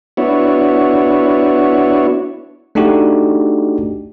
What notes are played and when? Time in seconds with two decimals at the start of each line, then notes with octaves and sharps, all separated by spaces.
0.17 B3 D4 E4 F#4 C#5
2.75 A3 D4 D#4 F#4 G4